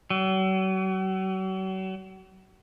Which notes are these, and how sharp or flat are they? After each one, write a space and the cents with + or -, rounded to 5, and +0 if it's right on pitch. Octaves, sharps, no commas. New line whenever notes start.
F#3 +40